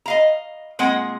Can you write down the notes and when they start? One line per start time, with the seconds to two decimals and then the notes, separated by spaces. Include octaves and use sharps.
0.06 D#5 F5 A#5
0.79 A#2 G#3 C4 G#4 F#5